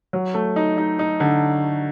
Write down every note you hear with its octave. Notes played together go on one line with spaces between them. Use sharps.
F#3
A3
D#4
D#4
D#4
D3